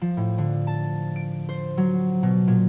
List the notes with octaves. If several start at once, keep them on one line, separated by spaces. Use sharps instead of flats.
F3
A2
D3
A5
D7
C5
F#3
B2
A#2